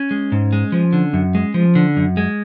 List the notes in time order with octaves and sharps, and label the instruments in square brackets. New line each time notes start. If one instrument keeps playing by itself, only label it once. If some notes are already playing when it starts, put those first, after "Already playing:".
Already playing: [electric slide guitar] C#4
G#3
G#2
G#3
F3
D3
F#2
G#3
F3
D3
F#2
G#3